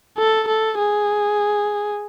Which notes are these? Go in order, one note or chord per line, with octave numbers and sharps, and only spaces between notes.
A4
A4
G#4